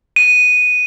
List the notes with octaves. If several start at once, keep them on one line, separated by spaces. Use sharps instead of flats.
D#7